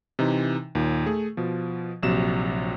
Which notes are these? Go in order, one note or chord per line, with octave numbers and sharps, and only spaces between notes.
C3 E3 D#4
D#2 A#2
A3 G#4
B2 F3
A#1 C3 F#3 E7